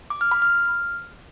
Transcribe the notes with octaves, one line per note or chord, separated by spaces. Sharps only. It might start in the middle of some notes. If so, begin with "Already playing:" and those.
D6
F6
B5
F6